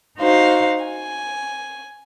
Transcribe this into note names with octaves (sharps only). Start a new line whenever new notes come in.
D#4 F#4 C5 F5
G#5